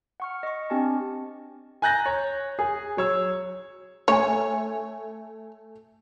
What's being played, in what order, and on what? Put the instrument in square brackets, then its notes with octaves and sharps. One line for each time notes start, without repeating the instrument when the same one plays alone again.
[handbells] F#5 C#6 F6
D#5 C#6
C4 D4 G4 G#5 A5
[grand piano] G#5 A#5 F#6 G6 A6 A#6
C#5
G#4
F#3 C#5 E6
[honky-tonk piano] A3 G#5 [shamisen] C#5